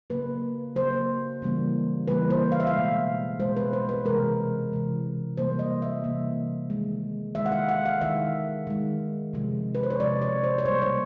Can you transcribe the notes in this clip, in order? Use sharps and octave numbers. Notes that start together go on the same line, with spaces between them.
C#3 F#3 A#3 B4
C#3 F#3 A#3 C5
C#3 E3 G3 A#3
C#3 E3 G3 A#3 B4
C5
F5
E5
F5
B2 G#3
B2 G#3 C5
B4
C5
B4
C3 E3 G#3 A#4
C3 E3 G#3
C3 E3 G3 A#3 C5
D#5
E5
C3 E3 G3 A#3
D#3 G#3
D#3 G#3 E5
F#5
F5
F#5
F5
D#3 G#3 E5
D#3 G#3
C3 F3 G#3
B4
C5
C#5
C3 F3 G#3 D5
C#5
C5
C#5
B2 G3 A#3 C5
C#5